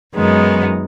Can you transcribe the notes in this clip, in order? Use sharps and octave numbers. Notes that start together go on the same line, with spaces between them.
F#2 D#3 G#3 B3 D#4